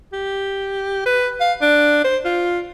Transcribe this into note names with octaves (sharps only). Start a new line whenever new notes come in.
G4
B4
F5
D4
C5
F4